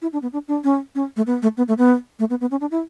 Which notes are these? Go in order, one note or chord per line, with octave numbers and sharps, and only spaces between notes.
E4
D4
B3
D4
D4
C#4
C#4
A3
B3
A3
B3
A3
B3
A3
B3
B3
C#4
D4
E4